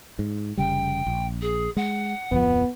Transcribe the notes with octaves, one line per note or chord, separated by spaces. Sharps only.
G#2
F1 C#3 G3 G5
A#1
G#4
G#3 F#5
D1 F2 F3 B3